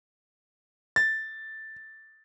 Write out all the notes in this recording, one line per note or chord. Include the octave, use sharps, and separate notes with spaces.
A6